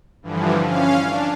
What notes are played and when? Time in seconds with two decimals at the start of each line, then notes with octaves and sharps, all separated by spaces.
0.22 G2 D3 E3 F3
0.63 C#4 F5
1.03 D4